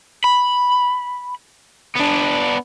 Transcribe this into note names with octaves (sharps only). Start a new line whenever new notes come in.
B5
B3 D4